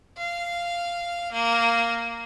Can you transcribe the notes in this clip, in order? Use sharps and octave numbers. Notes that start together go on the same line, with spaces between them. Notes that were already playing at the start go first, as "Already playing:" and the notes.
F5
A#3